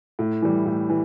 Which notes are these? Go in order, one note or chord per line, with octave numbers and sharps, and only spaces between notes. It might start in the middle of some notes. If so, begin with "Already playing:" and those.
A2
E3 G3
A2
E3